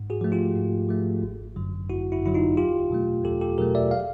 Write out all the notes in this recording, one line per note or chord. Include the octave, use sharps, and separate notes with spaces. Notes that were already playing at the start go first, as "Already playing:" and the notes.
Already playing: G#2
F#4 G#4
F3 A3
F4 G4
G#2
F3 A3
G1
F#2 D3 F#3
G1 E4 F#4
E4 F#4
F#2 D3 F#3 E4
D#4 F4
E2 F4 G4
B2 F#3 A3
E2 G4 A4
G4 A4
B2 F#3 A3 G#4 A#4
D5 E5
F5